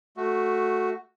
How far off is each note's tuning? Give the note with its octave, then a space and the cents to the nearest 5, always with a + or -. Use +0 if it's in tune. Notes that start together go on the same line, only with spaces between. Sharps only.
A3 +0 F#4 +0